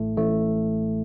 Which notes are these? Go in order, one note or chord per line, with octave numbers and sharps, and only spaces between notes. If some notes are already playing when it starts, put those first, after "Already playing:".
Already playing: A1 A2 A3
A1 A2 A3